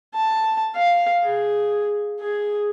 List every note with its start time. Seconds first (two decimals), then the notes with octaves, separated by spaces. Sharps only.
0.15 A5
0.76 F5
1.23 G#4
2.20 G#4